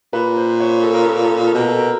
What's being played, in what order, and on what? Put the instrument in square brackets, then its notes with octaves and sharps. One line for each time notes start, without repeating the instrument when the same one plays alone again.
[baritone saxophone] A#2 [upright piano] B4
[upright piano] C5
C#5
A4
A#4
A4
A#4
A4
A#4
A4
[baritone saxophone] B2 [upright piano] A#4
[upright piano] A4
A#4